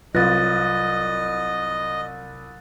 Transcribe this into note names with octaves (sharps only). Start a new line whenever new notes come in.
C2 F#3 F4 B4 D#5 F#6 A6 A#6